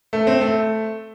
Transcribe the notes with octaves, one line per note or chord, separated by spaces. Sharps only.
A3
C4
A3